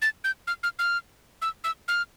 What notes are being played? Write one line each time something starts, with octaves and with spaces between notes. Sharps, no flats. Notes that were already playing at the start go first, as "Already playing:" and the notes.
A6
G6
F6
F6
F6
E6
E6
F6